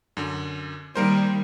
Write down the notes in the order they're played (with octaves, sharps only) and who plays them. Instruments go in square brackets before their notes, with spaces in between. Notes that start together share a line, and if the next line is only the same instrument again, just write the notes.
[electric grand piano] F#2 D3
[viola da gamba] D#3 G3 [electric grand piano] A#3 A#4 C5